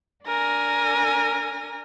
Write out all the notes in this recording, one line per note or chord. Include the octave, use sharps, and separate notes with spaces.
D4 A#4 G#5 A#6